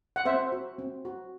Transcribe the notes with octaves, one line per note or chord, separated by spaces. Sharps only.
F#5
C4 C5 E5
F#4
C4
F#4